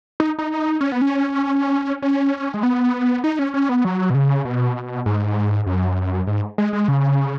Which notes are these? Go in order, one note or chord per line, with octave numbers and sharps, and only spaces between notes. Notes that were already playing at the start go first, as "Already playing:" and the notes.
D#4
D#4
C#4
B3
C#4
C#4
G#3
B3
D#4
C#4
C#4
B3
F#3
B2
C#3
B2
G#2
F#2
G#2
G#3
G#3
C#3